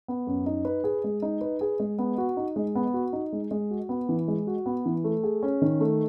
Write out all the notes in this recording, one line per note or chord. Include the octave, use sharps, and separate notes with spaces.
B3
F#2
D#4
B4
G#4
G#3
D#4
B4
G#4
G#3
B3
F#4
D#4
G#3
B3
F#4
D#4
G#3
G#3
F#4
B3
E3
G#3
F#4
B3
E3
A3
G#4
C#4
D#3
A3